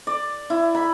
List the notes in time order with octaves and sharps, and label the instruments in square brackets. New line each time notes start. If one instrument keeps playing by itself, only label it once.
[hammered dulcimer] D5
E4
B5